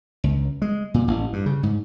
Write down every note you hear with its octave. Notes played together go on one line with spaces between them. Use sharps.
C#2
G#3
A#2
A1
G2
C#3
G#2